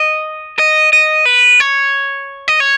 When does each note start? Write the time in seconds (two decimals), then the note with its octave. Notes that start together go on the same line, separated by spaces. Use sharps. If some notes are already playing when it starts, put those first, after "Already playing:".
Already playing: D#5
0.59 D#5
0.93 D#5
1.25 B4
1.60 C#5
2.48 D#5
2.60 C#5